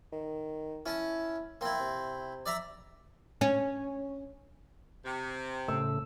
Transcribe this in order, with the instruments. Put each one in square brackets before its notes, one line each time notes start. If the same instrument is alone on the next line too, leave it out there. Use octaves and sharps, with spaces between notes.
[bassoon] D#3
[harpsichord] C#4 A5 [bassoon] E4
[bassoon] A#3 [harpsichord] C4 E4
[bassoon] C3
[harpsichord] D5 E5 A#5
[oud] C#4
[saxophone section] C3
[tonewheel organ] A2 C#3 A3 [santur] E6